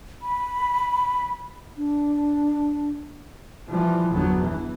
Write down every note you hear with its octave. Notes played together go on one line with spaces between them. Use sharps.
B5
D4
E3 F3 G3
G1 E2 D3 F#3 B3
E3